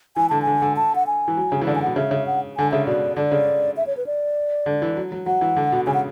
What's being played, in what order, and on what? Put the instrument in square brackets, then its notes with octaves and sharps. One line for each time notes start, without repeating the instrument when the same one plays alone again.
[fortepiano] E3 [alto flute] G#5
[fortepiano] D3 [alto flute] A5
[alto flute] G#5
[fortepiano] D3
D3
[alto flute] A5
F#5
G#5
[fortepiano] E3
F#3
C#3
E3
[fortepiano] D3 [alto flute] D5
[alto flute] G#5
[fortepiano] B2 [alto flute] F#5
[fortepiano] C#3 [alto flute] E5
[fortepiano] C#3
[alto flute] F#5
[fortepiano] D3 [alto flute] G#5
[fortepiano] C#3 [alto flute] E5
[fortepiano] B2 [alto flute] D5
[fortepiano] D3 [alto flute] D5
[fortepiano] C#3
[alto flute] E5
C#5
B4
D5
[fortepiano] D3
E3
F#3
F#3
[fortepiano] F#3 [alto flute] F#5
[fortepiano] E3
D3
B2
[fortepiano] C#3 [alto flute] G#5
[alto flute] F#5